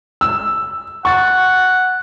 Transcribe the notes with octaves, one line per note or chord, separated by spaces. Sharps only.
E6
F#5 C#6 A6